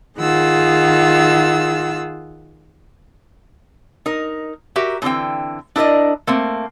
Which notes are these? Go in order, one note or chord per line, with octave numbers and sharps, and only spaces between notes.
D#3 F4 G#4 F#5 E6
D#4 A#4
F#4 G4 A#4 E5
A#2 D3 E3 C4 G5
D4 E4 A#4 D5 D#5
A3 A#3 C4